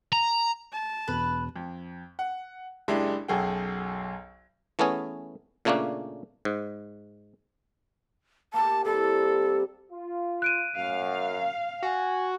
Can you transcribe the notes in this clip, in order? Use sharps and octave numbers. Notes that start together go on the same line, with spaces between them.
A#5
A5
E1 B4
F2
F#5
F#1 G#3 D4 E4 G4
B1 F#2 G#4 A4 F#5 G5
E3 A3 B3 C#4 G#4
A#2 C#3 A3 A#3 C#4 D4
G#2
A#3 G4 A5
C3 G3 E4 A4
F4
F#6 D7 D#7
F#2 F5
F#4 G#5